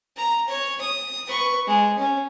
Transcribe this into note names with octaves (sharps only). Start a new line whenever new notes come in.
A#5
C#5
D#6
B4 C#6
G#3
C#4